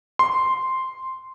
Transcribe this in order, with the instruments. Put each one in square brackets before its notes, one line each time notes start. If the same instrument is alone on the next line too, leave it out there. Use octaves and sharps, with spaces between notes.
[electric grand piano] C6